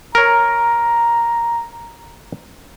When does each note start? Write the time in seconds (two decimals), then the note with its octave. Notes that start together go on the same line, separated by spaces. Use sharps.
0.15 A#4 C#5 A#5